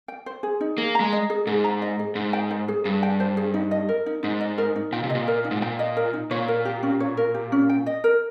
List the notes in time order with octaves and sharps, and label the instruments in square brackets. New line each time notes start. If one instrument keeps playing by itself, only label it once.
[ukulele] G5
C5
G#4
D#4
[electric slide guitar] A#3 [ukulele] G#4
[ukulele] A#5
[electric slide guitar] G#3
[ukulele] D#5
G#4
[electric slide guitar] G#2 [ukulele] G#4
[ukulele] A#5
D#5
G#4
[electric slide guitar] G#2 [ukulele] G#4
[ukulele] G5
C5
G#4
[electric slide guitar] G2 [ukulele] G#4
[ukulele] G5
C5
G#4
D#4
D#5
A#4
D#4
[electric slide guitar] G#2 [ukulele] D#4
[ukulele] D#5
A#4
D#4
[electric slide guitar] A#2 [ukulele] G5
[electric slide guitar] C3
[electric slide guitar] A#2 [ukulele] D#5
[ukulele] A#4
D#4
[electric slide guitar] G#2
[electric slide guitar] A#2 [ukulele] G5
[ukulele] D#5
A#4
D#4
[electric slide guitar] A#2 [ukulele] C#5
[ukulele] A#4
G4
C#4
C#5
A#4
G4
C#4
G5
D#5
A#4